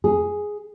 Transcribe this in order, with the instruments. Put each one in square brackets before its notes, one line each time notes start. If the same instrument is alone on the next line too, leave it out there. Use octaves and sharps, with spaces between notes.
[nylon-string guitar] G#4